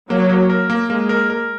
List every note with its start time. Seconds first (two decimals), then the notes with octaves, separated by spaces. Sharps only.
0.10 F#3 A#3
0.29 A#3
0.50 A#4
0.70 A#3
0.90 G#3 A#3
1.09 A#4
1.30 A#4